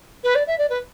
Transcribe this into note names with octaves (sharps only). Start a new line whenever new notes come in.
B4
D5
E5
D5
B4